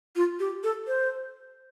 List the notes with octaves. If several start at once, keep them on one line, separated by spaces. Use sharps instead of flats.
F4
G4
A4
C5